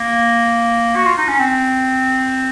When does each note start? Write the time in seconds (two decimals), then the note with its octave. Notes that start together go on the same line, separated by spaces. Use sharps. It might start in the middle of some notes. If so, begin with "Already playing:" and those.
Already playing: A#3
0.96 F#4
1.06 F4
1.18 D#4
1.28 C#4
1.39 C4